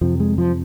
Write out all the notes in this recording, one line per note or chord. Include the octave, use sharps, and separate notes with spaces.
F2 C3 F3
G#3
F3